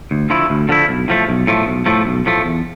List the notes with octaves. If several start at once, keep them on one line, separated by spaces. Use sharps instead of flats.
D2
D3 F3 A3 E4
D2
D3 F3 A3 E4
B1
A2 F3 A3
B1
A2 F3 A3
B1
A2 F3 A3
B1
A2 F3 A3
E2